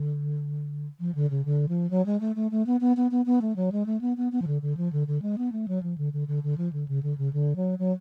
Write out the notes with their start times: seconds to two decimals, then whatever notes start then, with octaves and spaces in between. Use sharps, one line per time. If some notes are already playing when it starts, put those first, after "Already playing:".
Already playing: D3
1.00 F3
1.15 D3
1.30 C#3
1.45 D3
1.69 F3
1.91 F#3
2.06 G#3
2.21 A3
2.36 A3
2.51 A3
2.66 B3
2.81 B3
2.97 B3
3.11 B3
3.26 B3
3.42 A3
3.56 F#3
3.72 G#3
3.86 A3
4.01 B3
4.17 B3
4.32 B3
4.42 F3
4.47 D3
4.62 D3
4.77 F3
4.93 D3
5.07 D3
5.22 G#3
5.38 B3
5.52 A3
5.68 F#3
5.83 F3
5.98 D3
6.13 D3
6.28 D3
6.43 D3
6.58 F3
6.73 D3
6.88 C#3
7.03 D3
7.18 C#3
7.33 D3
7.56 F#3
7.79 F#3